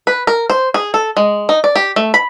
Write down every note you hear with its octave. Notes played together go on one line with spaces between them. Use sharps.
B4
A#4
C5
G#4
A4
G#3
D#4
D5
G4
A3
B5